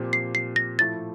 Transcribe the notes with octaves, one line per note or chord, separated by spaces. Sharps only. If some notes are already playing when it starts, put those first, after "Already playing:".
Already playing: A#2 F3 C4 G4
C7
C7
A#6
A2 F3 A3 E4 A6